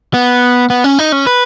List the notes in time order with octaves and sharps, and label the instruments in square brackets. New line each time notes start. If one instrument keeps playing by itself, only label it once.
[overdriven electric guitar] B3
B3
C#4
D#4
C#4
B4